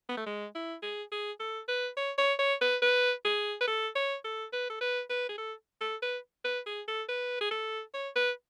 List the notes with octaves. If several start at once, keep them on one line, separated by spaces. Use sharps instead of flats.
B3
A3
G#3
E4
G#4
G#4
A4
B4
C#5
C#5
C#5
B4
B4
G#4
B4
A4
C#5
A4
B4
A4
B4
B4
G#4
A4
A4
B4
B4
G#4
A4
B4
G#4
A4
C#5
B4